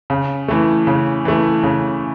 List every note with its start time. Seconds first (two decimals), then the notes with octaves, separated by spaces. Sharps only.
0.10 C#3
0.48 E3 A3
0.87 C#3
1.25 E3 A3
1.63 C#3